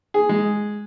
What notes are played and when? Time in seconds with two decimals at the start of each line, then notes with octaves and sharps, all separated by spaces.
0.14 G#4
0.29 G#3